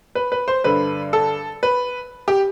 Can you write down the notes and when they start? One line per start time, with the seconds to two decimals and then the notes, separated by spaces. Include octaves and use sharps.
0.15 B4
0.32 B4
0.48 C5
0.64 G2 D3 B4
1.13 A4
1.63 B4
2.28 G4